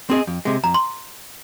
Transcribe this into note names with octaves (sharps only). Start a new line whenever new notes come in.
C4 G#4 D#5
F2
C3 G#3
F2 A#5
C6